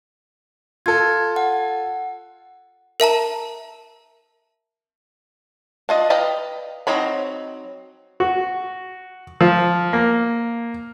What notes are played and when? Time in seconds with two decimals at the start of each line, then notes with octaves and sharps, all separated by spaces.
0.86 F4 A4 G#6
1.36 F#5
3.00 A#4 E5 A5 A#5
5.89 D4 F4 D#5
6.10 B4 D5 D#5 F5 G5
6.87 F#3 C4 D#4 C#5 B5
8.20 F#4
9.41 F3
9.93 A#3